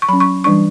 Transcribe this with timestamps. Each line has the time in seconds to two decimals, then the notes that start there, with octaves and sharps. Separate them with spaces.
0.02 C#6
0.09 F#3 C#4 B5
0.20 C#6
0.44 E3 G3 D4 C#6